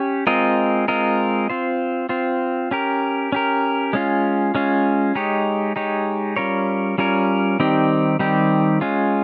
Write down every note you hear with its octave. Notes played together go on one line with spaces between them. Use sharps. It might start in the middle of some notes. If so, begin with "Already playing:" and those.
Already playing: C#4 G4 C#5
G#3 C4 F4 A#4 D#5
G#3 C4 F4 A#4 D#5
C4 F4 C5
C4 F4 C5
C#4 G4 A#4
C#4 G4 A#4
G#3 C#4 F4
G#3 C#4 F4
G#3 D#4 G4 C#5
G#3 D#4 G4 C#5
G3 C#4 F4 A#4 C#5
G3 C#4 F4 A#4 C#5
D#3 G3 C4 D#4 G4
D#3 G3 C4 D#4 G4
G#3 C#4 F4